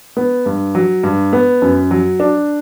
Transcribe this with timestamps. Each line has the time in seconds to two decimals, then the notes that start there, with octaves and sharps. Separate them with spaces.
0.17 B3
0.46 G2
0.75 F#3
1.03 G2
1.33 B3
1.62 F#2
1.91 F#3
2.20 D4